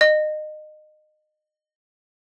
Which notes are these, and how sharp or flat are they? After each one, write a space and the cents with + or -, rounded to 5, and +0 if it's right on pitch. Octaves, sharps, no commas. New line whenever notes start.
D#5 -25